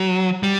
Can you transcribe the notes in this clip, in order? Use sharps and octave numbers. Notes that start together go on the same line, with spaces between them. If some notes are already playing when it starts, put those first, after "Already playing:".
Already playing: F#3
G3